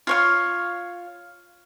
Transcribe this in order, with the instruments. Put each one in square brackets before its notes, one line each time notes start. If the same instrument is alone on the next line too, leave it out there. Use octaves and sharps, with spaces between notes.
[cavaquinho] F4 C#5 F5